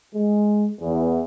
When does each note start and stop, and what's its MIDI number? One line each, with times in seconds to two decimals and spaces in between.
0.15 0.69 56
0.81 1.23 40